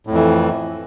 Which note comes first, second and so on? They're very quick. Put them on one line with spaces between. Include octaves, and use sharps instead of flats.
A2 F2 E3